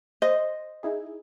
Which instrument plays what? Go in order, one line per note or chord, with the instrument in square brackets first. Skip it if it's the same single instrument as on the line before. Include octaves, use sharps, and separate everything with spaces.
[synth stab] C5 [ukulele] D#5
[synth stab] D#4 E4 G#4